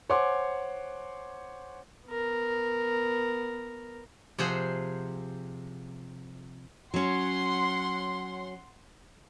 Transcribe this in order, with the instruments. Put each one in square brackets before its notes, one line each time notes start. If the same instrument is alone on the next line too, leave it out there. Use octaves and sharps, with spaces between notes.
[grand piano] C5 C#5 F#5 G#5 C6 D6
[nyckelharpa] B3 A#4
[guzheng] C3 F3 G#4 C5 F#5
[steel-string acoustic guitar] F#3 C#4 [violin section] F#5 C6